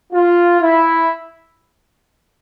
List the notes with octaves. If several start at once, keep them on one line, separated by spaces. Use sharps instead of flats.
F4
E4